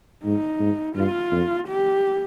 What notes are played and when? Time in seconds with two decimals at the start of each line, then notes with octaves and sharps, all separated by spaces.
0.25 G#2 D#4
0.60 G#2
0.95 G2 F4
1.32 F2
1.67 G4